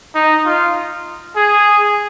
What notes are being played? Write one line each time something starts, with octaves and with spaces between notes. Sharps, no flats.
D#4
F4
G#4